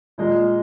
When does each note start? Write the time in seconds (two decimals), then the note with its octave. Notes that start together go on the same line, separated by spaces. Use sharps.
0.18 A#2 G#3 D#5